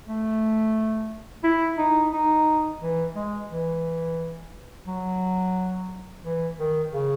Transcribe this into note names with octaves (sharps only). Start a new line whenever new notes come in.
A3
E4
D#4
D#4
E3
G#3
E3
F#3
E3
D#3
C#3